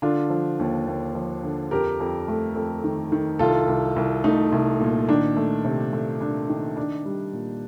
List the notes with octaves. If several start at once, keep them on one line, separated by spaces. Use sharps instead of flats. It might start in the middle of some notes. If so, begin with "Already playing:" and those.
D3 D4 F4
F3
D#2
D#2
F3
D3
F2 G4 A#4
F2
A3
F2
D#3
D#3
C2 F4 A4
C2
C2
A3 D#4
C2
A#2
D#3 D4
A3
C3
A3
D4
D#3
D4
G3
A#2